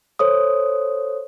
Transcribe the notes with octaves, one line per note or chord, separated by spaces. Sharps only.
A4 C5 C#5 D#6